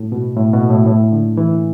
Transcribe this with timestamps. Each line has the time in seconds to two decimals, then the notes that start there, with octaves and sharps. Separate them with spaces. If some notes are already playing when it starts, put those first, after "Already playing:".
Already playing: A2
0.12 B2
0.37 A2
0.54 B2
0.70 A2
0.87 A2
1.12 D3
1.37 E3